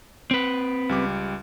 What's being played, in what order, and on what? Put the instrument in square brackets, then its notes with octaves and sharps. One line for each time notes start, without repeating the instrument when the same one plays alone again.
[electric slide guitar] C4 B4
[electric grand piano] C#2 G3 D6